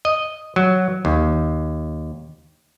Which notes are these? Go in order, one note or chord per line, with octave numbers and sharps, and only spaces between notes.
D#5
F#3
D#2